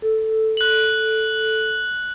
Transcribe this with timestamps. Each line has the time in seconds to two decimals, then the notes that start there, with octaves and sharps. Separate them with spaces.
0.02 A4
0.57 F#6 F#7